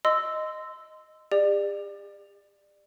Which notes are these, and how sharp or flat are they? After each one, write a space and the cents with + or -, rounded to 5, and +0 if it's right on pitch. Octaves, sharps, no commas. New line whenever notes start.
D#5 +0 C6 -20 E6 +0
G4 +45 D5 +25